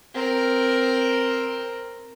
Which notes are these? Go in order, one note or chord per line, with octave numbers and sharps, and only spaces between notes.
C4 A#4